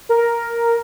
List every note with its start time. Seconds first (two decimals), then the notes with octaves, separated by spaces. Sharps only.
0.09 A#4